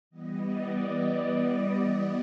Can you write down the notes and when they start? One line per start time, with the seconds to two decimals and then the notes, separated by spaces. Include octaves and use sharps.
0.10 E3 G3 B3 D#5
0.39 D5